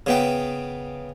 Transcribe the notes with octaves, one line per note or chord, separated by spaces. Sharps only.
C#3 B3 G5